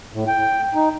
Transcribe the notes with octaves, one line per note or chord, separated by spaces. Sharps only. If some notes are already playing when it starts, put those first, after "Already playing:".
A2
G5
D#4